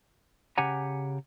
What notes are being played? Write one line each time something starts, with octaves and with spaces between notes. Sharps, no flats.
C#3 G4 F#5 G#5 A#5